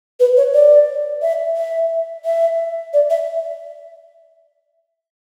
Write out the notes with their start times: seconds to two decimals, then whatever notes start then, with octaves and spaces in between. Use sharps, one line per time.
0.20 B4
0.37 C#5
0.54 D5
1.22 E5
1.56 E5
2.25 E5
2.93 D5
3.10 E5